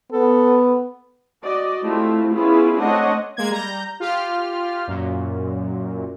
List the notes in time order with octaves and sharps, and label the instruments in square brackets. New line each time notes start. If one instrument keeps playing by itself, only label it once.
[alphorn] B3 [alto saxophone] A4
[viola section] F#4 D5 D#5
A3 C4 E4 F4 G4
B3 C#4 E4 F4 G#4 B4
A3 C4 D4 C#5 D#5 F#5
[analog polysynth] G#3 A#3 G#6
G3 A#5 G6
F4 G4 F6
F#2 A#2